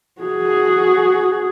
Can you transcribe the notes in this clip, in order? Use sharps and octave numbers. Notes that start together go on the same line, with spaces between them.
F#4 G#4